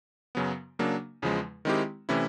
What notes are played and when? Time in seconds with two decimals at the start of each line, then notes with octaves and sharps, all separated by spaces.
0.35 F#2 C#3 F#3 B3
0.79 C#3 F#3 A#3 D4
1.22 E2 C#3 F3 G#3
1.65 D#3 G#3 C4 E4 G4
2.09 C3 E3 A3 C#4 E4